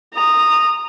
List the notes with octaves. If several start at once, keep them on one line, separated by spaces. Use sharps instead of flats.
A#5 D#6